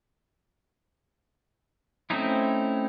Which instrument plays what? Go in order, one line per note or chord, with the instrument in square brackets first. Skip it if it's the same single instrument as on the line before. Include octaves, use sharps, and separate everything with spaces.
[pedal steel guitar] A3 C4 C#4 D#4 E4